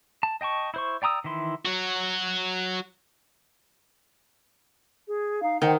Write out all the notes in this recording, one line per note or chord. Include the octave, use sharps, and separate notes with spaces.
A5
D#5 G5 A5 C#6
E4 C5 C#6
D5 G5 A#5 D#6 E6
D#3 E3 E4 C6
F#3 F#4
G#4
D#4 F5
D#3 C5 F#5 G5